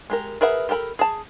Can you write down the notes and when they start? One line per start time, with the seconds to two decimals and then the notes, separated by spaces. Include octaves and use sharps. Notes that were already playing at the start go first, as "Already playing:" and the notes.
0.10 G#3 G4 A#4
0.41 G#4 A#4 B4 E5 F#5
0.69 G4 A4 A#4 A5 B5
0.99 G#4 A5